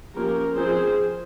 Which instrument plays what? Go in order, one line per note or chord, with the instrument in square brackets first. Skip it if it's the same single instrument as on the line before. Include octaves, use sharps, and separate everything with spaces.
[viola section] F3 A#3 C#4 G4 A#4
F3 C4 G#4 C5